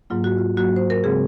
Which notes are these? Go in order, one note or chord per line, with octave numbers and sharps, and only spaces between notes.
G#2 F#3 A#3 F4
F#4
F4
G#2 F#3 A#3 F#4
C5
A#4
C#3 G#3 C4 G#4